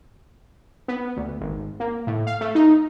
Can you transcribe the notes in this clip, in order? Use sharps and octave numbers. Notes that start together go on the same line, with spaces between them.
B3
D2
G#1
A#3
A2
F5
A3
D#4